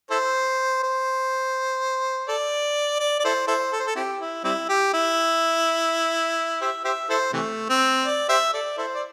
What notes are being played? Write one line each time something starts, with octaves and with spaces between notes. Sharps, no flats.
E4 A4 C5
C5
A4 D5
D5
D5
E4 A4 C5
E4 A4 C5
A4
C5
A4
C4 E4 G4
E4
G3 C4 E4
G4
E4
G4 C5 E5
G4 C5 E5
E4 A4 C5
C3 E3 A3
C4
D5
G4 C5 E5
A4 D5
E4 A4 C5
D5